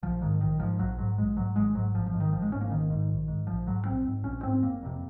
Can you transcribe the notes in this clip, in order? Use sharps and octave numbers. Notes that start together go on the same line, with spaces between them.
A#1 F3
G#2 D#3
A#1 D#3
G#2 F3
A#1 F#3
G#2 F#3
A#1 G#3
G#2 F#3
G#1 G#3
G#2 F#3
G#1 F3
F3
G#2
D#3
G#1 F3
G#3
G#2 C#4
A#3
G#1 D#3
G#2
A#1
G#2
A#1 F3
G#2 F#3
A#1 C4
G#2
A#1 C#4
G#2 C4
F#1 A#3
F2 C3